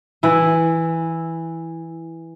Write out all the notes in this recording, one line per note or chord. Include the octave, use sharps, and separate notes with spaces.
E3 E4